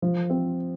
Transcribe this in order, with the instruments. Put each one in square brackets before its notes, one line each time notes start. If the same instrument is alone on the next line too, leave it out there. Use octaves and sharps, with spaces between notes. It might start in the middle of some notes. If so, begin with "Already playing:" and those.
[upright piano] F3
C4